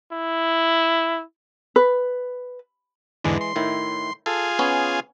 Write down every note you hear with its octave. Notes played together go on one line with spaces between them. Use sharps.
E4
B4
E2 G#2 D3 E3 G#3
C6
A2 D#3 E4
F4 G#4 A4
B3 C#4 C#5